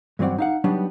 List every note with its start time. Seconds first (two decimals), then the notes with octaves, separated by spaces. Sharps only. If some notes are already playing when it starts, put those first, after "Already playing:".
0.19 G2 E3 F#3 C4 D5 F#5
0.38 D#4 F5 F#5
0.64 F#3 G3 B3 D4 D#4